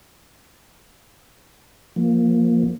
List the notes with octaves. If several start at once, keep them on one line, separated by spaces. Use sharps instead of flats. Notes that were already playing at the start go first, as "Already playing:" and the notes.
F3 A#3